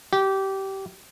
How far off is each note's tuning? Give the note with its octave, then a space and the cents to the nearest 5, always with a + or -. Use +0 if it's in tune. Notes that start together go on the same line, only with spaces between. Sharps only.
G4 -20